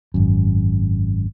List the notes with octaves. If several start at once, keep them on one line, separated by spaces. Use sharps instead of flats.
G#1 F#2